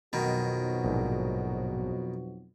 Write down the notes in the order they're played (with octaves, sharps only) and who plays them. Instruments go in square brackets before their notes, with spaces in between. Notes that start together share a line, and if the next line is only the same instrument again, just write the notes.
[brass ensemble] B1 F2 F#4 [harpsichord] B2 D#3
[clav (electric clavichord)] A#1 G#2